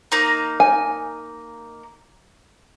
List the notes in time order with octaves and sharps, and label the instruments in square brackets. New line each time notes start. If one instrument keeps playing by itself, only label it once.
[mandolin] A#3 D#4
[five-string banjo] G#5